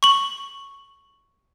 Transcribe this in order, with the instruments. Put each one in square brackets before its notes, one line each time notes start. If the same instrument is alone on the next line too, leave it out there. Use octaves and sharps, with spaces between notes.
[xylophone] C#6 F#7